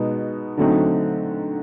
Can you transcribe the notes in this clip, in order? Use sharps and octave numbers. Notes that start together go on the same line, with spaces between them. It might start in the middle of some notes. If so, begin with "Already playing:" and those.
Already playing: B2 G#3 B3 D#4
D3 F#3 A3 C4 D#4